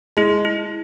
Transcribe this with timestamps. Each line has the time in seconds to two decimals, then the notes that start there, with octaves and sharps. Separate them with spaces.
0.17 G#3 E4
0.45 E4